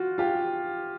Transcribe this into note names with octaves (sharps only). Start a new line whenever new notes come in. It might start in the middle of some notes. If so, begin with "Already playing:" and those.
Already playing: F4 F#4
F4 G4